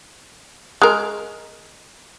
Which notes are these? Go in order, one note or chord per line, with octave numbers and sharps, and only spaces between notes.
G#3 A#4